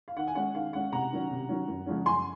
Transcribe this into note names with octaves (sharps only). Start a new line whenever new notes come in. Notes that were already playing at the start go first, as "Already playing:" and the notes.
F5
D#3 F#5
G#5
G#3 C#4 F#5
D#3 F5
G#3 C#4 F#5
C3 F#5 A#5
D#3 F#3 C#4
C3
D#3 F#3 C#4
F#2
C#3 F3 G#3 C#4
F#2 G#5 C6